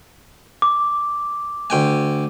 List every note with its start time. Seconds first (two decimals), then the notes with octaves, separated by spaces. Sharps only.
0.62 D6
1.70 D2 G5 G#5